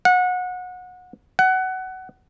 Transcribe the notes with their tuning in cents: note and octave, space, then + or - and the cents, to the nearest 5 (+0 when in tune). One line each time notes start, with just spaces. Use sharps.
F#5 -25
F#5 +20